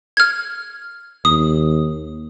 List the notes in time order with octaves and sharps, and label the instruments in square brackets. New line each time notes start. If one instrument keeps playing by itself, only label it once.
[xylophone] F6 G#6
[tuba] D#2 [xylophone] D#6